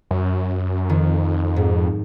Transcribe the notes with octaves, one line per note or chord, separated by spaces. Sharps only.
F#2
F2 D#3
G#2